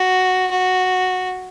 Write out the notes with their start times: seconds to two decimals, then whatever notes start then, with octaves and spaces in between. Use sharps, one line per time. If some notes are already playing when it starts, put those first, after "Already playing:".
Already playing: F#4
0.51 F#4